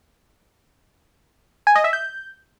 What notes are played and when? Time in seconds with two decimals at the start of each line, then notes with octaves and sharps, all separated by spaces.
1.67 G#5
1.76 D#5
1.84 E5
1.93 G6